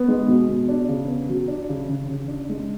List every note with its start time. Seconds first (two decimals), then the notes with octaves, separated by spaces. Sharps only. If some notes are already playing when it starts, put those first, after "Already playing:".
Already playing: B3
0.08 G#3
0.28 B2
0.49 B2
0.69 D4
0.89 C#3
1.08 B3
1.29 F#3
1.48 D4
1.69 C#3
1.89 C#3
2.09 C#3
2.28 D4
2.49 G#3